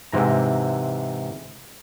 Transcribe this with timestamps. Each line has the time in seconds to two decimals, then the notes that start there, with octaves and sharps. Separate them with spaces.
0.12 G#2 C3 E3 A#5